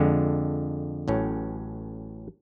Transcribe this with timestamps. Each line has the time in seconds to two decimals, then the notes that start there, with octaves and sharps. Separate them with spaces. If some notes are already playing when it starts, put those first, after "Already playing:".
Already playing: F2 D3 G#3
1.08 A1 A2 F#3 C#4